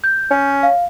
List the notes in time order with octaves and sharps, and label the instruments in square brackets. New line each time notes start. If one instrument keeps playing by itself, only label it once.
[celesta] G6
[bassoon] C#4
[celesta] F5